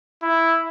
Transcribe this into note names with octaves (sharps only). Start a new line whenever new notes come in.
E4